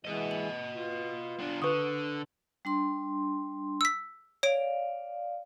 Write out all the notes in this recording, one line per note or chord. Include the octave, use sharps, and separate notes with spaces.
E3 G#3 B4 D#5
F#7
F4
B3 D4
D3 B4 C#6 D#6
G3 D4 C6
E6 B6
C#5 D5 F5 D7